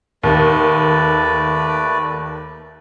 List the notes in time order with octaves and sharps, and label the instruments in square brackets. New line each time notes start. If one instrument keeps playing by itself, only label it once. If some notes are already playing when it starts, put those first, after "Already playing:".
[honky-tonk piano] D#2 [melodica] A3 B4 D5